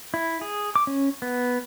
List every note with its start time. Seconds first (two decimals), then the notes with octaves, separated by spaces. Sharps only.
0.14 E4
0.41 G#4
0.76 D6
0.87 C#4
1.22 B3